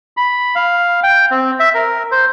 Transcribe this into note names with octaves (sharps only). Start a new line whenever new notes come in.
B5
F5
G5
C4
E5
A#4
C5